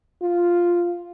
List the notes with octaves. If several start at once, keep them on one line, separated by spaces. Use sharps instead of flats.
F4